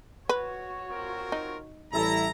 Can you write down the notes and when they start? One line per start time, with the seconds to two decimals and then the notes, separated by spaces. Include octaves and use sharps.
0.29 F#4 B4 C#5
0.91 C4 F4 A#4
1.32 D#4
1.93 A1 G3 E4 A4 A#5